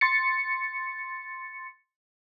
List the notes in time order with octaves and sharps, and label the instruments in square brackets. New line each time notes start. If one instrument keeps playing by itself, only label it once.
[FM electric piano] C6 A6 C#7